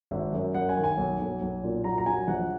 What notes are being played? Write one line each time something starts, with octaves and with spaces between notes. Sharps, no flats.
G#1 E5
F#2
F#2 F#5
G#5
D#3
G#5
B1
B1
B1
A#2
F#3 A#5
A#5
F#3 G#5
A#1 F#5